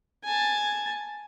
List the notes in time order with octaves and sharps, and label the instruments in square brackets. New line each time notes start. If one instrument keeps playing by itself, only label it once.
[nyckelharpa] G#5 A5